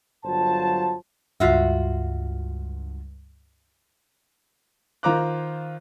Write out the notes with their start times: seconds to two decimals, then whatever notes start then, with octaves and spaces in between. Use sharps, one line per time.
0.25 G1 F#3 F4 C5 A5
1.40 C#2 G2 F4 F#4 E5
5.03 D#3 F4 C5 A#5 D6 F#6